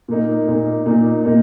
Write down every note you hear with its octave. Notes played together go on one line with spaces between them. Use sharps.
A#2 A#3 D#4
A#2 A#3 D#4
A#2 A#3 D#4
A#2 A#3 D#4